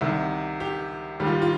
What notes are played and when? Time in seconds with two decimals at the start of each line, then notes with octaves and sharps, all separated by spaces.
0.01 C2 C3 D#3
0.60 G4
1.20 D#2 D#3 G3 G4
1.27 F4
1.42 F4